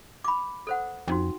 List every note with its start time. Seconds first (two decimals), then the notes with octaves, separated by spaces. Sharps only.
0.24 B5 D6
0.67 A4 C5 F#5
1.08 F2 C#4 D#4 F#4